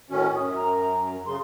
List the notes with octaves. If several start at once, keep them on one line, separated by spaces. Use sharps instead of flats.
A2 D#3 C#4 F#4
F#2 D#6
A#5
C#3 C6